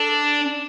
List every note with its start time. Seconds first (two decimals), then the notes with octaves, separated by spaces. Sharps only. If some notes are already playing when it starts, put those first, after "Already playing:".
Already playing: D4 A4